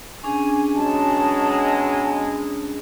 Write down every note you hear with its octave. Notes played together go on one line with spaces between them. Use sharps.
C#4 D4 G#4 G#5
B2 F#3 G#3 A5